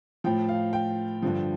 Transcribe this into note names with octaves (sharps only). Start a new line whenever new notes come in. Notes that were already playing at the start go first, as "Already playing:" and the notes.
A2 F3 G5
F5
G5
G2 D3 F3